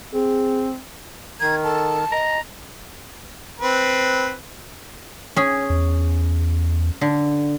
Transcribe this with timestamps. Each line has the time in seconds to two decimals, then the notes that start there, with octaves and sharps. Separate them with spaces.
0.14 C4 G#4
1.40 D#3 A#5 G#6
1.63 A4 A5
2.12 D#5 A#5
3.60 C4 B4
5.36 C#4 G#4
5.70 E2
7.01 D3